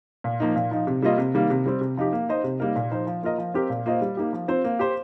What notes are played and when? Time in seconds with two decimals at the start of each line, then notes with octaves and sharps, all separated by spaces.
0.24 A#2
0.40 F3 A#3 D#4
0.56 A#2
0.71 F3 D#4
0.87 C3
1.02 G3 A#3 F4 D#5
1.18 C3
1.34 D#3 G3 A#3
1.50 C3
1.66 G3 C4
1.81 C3
1.97 F3 D#4 G4
2.13 A#3
2.29 D#4 C5 D#5
2.44 C3
2.60 G3 A#3 D#4 A#4
2.76 A#2
2.91 F3 D#4 C5
3.07 F3
3.23 A#3 F4 A#4 D#5
3.38 F3
3.54 C4 G4 A#4
3.70 A#2
3.86 A#3 F4 C5 D#5
4.01 G3
4.17 A#3 D#4 G4
4.33 F3
4.48 C4 F4 C5
4.64 A#3
4.79 G4 C5